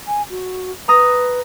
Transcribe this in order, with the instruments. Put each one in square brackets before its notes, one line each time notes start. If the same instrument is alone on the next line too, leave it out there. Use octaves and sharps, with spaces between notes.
[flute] G#5
F#4
[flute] B4 [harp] A#5 D#6 A#6